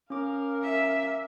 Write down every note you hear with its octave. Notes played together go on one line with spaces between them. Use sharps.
C#4 A#4 F5 D6
E5